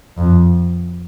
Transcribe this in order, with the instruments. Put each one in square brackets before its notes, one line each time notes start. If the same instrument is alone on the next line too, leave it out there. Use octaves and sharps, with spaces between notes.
[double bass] F2